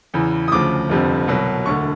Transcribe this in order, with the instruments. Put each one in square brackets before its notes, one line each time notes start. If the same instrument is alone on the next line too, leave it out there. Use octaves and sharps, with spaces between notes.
[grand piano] E2 C#3 E3
D#6
D2 C#3 F3 D6
F1 F2 D3 G3 C4
C2 B2 F#3
E1 D2 D3 C#6